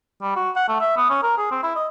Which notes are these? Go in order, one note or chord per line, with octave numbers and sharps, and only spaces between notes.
G3
F#4
F#5
A3
E5
B3
C#4
A#4
G#4
C4
E4
D#5